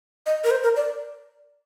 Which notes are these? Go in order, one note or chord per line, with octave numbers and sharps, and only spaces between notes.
D#5
A#4
C5
A#4
D5